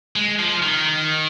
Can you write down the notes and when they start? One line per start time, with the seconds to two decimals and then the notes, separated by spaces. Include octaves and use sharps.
0.16 G#3
0.39 F3
0.62 D#3